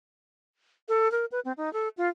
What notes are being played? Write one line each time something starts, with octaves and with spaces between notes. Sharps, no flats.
A4
A#4
B4
C4
D#4
A4
F4